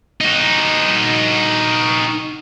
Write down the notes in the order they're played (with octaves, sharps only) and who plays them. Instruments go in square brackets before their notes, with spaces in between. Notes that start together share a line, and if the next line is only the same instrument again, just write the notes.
[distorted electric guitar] D#4 F#4